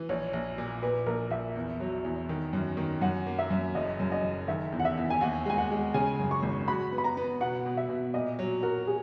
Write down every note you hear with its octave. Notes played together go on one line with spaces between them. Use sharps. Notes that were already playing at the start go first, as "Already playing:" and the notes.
Already playing: E3
A#1 C#5
A#1
A#2
A#2 B4
A#1 A#4
A#1 E5
E2
F#3
E2
D#3
F#2
D#3
F#2 F#5
A#3
E5
F#2
F#1 D#5
F#2
D#5
F#1
D#3 E5
E2
F#5
E5
E2
G#5
D#2 F#5
G#3 G#5
F#5
G#3
C#3 G#5
F#2
C#6
G#1
F#4 B5
B3
B5
A#5
B3
B2 F#5
B2
E5
B2
A#2 D#5
F#3
F#4 A#4
G#4